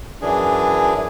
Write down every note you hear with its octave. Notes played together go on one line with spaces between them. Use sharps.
F#2 E3 D4 G#4